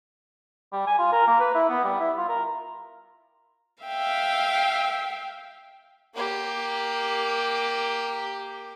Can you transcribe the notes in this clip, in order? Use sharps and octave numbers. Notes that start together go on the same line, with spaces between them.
G3
G#5
F4
A#4
A#3
B4
E4
B3
G3
E4
F4
A#4
E5 F5 G5
A#3 G4